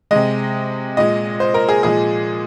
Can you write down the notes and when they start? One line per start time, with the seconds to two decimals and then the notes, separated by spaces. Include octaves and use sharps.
0.11 C3 G#3 D#5
0.97 A#2 G#3 D#5
1.40 C5
1.54 A#4
1.69 G#4
1.83 A#2 F3 G#3 G#4